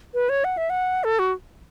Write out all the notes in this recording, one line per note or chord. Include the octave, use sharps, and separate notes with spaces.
B4
C#5
F#5
E5
F#5
A4
F#4